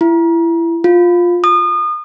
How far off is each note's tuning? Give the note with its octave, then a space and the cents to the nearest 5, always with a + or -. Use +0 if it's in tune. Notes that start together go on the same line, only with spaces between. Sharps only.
E4 +25
F4 +10
D#6 -30